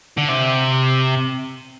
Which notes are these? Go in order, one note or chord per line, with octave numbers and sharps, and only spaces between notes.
D3
C3